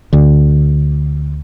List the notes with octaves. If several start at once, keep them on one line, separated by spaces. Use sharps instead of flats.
D2 D3